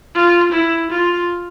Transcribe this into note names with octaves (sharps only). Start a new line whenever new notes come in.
F4
E4
F4